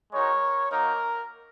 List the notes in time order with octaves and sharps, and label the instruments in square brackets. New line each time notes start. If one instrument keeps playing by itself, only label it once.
[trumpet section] G#3 D#4 F#4 A#4 C#5
A#3 D#4 F#4 A#4